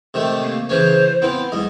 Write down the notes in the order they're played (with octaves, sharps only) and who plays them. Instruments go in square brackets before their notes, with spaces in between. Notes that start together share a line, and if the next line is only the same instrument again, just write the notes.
[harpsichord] C3 D#3 A3
[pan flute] A#3
[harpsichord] C#3 E3 C#4 [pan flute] C5
[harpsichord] B3 C4 F5 [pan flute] E4
[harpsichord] B1 G#2 D#5